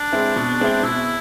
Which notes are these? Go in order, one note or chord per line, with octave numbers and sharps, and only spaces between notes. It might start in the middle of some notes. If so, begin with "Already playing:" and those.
Already playing: D4
G#3 C4 E4
B2
G#3 C4 E4
B2 E4